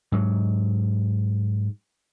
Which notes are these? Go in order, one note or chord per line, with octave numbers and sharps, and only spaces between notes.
G#2 F#3